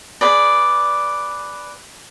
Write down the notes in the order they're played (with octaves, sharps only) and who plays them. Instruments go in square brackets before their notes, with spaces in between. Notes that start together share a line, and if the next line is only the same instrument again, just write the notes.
[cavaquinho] G#4 B4 D5